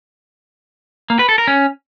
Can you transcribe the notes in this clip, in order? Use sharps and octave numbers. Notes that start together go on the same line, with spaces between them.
A#3
B4
A4
A#4
C#4